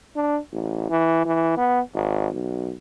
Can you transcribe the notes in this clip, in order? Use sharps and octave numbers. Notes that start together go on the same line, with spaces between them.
D4
A1
E3
E3
B3
G#1
B1